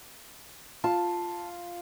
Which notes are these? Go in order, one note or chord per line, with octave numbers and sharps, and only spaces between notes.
F4 A5